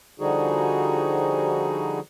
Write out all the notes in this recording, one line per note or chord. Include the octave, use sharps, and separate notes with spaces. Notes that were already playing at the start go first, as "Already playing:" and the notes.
D3 F3 G3 D#4 F#4 G#4